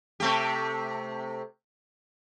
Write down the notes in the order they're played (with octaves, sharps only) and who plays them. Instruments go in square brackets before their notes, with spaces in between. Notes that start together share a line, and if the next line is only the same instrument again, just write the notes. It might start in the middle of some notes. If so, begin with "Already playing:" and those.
[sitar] C3 A3 G4